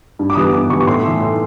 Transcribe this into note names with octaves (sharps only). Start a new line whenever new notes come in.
G2
D6
E3 G3 B3 D#6
G2 D6
E3 G3 B3 C#6
C#6
A2 C6
E3 A3
A2